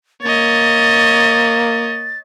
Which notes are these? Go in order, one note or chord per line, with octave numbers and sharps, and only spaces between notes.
A#3 C#5 D#5 A6